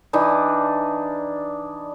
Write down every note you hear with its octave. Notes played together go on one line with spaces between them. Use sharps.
E3 D4 D#4